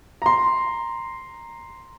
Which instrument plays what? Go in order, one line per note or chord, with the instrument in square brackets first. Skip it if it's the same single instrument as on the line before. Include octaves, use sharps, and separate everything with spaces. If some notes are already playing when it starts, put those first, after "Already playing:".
[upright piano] A#5 C6